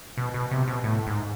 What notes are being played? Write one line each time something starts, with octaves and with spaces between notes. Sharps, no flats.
B2
B2
C3
B2
A2
G#2